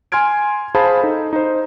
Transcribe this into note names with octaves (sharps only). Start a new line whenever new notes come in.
G#5 C6 F6 G#6 D7
G#4 C5 F5 A5 B5
D#4 A4
D#4 C5